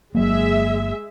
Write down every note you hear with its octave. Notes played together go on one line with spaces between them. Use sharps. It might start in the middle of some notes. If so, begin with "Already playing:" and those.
G1 F#3 G#3 A#3 G#4 E5